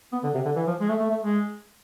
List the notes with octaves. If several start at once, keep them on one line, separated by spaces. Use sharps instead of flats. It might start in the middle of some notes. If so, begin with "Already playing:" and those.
B3
D3
C3
D3
E3
F3
G#3
A3
A3
A3
G#3